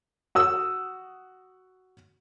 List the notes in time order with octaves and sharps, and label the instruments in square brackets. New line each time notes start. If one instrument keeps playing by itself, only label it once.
[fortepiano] F#4 D#6 E6